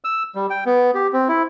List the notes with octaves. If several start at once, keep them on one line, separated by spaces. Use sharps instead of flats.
E6
G3
G5
B3
G4
C4
E4